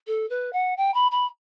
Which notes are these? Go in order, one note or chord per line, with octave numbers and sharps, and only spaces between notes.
A4
B4
F#5
G5
B5
B5